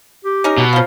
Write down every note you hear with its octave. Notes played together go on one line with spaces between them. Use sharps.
G4
C#4 D#4 A#4
B2
F3 F#3 F5